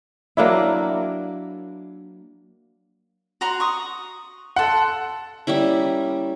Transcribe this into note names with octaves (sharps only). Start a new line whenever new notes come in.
F#3 A#3 D4 E4
F#4 A#5 C6
C#6 D#6
A4 F#5 C6
G3 A#3 C#4 E4